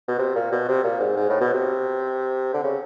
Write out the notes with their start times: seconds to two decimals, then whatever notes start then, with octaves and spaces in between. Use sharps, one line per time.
0.08 B2
0.18 C3
0.35 A#2
0.52 B2
0.68 C3
0.84 A#2
1.00 G#2
1.16 G#2
1.29 A2
1.40 B2
1.53 C3
2.53 D3
2.63 C#3